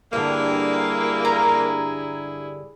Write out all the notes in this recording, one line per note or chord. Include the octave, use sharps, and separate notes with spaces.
G2 D3 A#3 E4 G#4
A#5